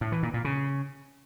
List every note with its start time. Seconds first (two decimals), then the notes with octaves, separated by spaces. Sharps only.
0.01 A2
0.12 E3
0.23 A#2
0.34 A#2
0.44 C#3